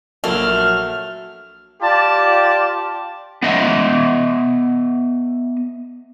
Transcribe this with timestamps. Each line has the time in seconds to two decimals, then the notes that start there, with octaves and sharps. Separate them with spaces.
0.24 A#1 F#3 A3 A#3 F6
1.82 F4 G4 D5 A5
3.43 B3 D#5 E5